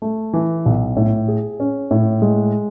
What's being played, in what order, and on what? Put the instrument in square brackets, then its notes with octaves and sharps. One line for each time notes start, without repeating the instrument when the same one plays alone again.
[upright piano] A3
E3
B1
A2
G#4
C#4
A2
G#3